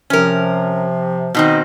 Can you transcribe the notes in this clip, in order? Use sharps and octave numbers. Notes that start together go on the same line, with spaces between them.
C3 F3 C#4 A#4
B2 D#3 C4 D#4 D#5